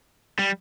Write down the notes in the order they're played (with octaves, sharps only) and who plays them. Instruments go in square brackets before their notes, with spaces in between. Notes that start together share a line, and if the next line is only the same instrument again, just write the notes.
[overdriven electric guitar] G3